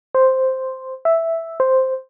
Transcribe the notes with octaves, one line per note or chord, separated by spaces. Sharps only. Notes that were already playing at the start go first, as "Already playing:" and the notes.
C5
E5
C5